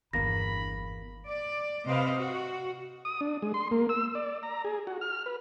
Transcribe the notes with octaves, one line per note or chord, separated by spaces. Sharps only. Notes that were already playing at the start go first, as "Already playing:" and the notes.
G1 E2 D3 A#3 B5 A#6
D5
C3 C4 B4 C5 D#5 F5
F#4
D#6
D4
G#3
C6
A#3
E6
D5
A#5
G#4
F#4
F6
B4